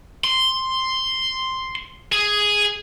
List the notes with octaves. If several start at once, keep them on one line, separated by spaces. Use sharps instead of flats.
C6
G#4